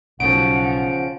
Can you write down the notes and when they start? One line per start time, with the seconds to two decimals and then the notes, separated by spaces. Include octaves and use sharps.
0.20 B1 C#3 F3 F#5 D7